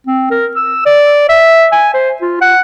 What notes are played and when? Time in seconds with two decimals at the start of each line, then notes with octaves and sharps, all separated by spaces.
0.07 C4
0.31 A#4
0.56 E6
0.86 D5
1.29 E5
1.72 G#5
1.94 C5
2.22 F4
2.41 F#5